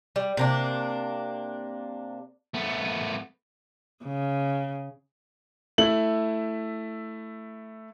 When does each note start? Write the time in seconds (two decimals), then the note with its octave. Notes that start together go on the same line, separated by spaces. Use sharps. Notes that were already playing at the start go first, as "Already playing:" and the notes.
0.16 G3
0.37 C3 A#3 D4
2.54 A3 B3
4.04 C#3
5.78 A3 E4 F#7